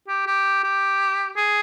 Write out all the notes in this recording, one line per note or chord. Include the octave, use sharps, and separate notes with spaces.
G4
G4
G4
G#4